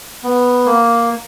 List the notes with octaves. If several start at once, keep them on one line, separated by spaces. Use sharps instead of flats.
B3
A#3